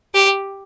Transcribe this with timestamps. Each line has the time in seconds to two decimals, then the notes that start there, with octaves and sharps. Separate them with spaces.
0.14 G4